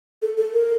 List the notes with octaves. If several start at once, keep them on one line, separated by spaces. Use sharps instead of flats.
A4
A4
A#4